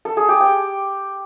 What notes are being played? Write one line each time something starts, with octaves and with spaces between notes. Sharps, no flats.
A4
G#4
G4
G5